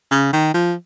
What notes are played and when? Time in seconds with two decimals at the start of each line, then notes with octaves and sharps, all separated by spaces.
0.11 C#3
0.33 D#3
0.54 F3